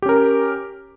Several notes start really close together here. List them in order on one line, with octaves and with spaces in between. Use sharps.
G4 C#4 A#4